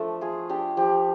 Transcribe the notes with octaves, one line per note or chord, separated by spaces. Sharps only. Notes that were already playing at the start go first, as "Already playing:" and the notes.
Already playing: F3 A3 D4 A4
F4 G#4
D4 G4
F3 G4